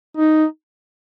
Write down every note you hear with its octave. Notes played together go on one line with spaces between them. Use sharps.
D#4